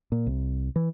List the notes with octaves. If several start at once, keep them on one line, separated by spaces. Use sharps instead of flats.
A#2
C2
E3